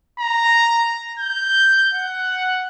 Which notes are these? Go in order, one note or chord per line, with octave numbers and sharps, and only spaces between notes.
A#5
G6
F#5